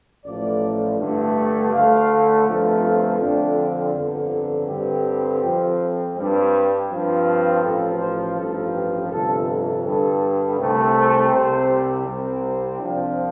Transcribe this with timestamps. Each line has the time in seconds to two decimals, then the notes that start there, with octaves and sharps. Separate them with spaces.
0.25 A1 A2 F3 A3 D5
0.99 G1 G2 D3 A3
1.72 D2 D3 A3 F5
2.47 G1 F2 F3 A3
3.20 F2 D3 F3 C4 D4
3.94 G1 F2 D3
4.68 G2 D3 G3 C4 G4
5.42 F2 F3 C4
6.16 G2 G3 C4
6.90 G2 F3 C4
7.63 A1 A2 F3 A4
8.00 C5
8.37 A1 G2 F3 A4
8.75 G4
9.11 G1 F2 C3 A4
9.85 G2 D3 G3 A4
10.59 C2 C3 A3 C4
11.32 C2 C3 G3 C5
12.06 C2 C3 G3 C4
12.80 C2 C3 F3 C4 D4